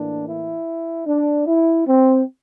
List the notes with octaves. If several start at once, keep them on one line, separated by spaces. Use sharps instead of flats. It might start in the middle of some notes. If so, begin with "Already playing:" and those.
Already playing: A2 E3 A#3 D4
E4
D4
E4
C4